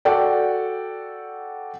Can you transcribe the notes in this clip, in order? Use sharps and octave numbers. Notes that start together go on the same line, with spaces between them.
F#4 A4 D5 F#5 G5